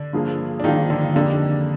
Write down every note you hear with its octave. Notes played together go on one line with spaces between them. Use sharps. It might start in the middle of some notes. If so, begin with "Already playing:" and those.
Already playing: D3 D4
G2 F3 A#3 F4 G#4
D4
G2 D#3 F3 A#3 D#4 F4 G#4
D3 D4
F2 D3 D#3 A#3 D4 D#4 G4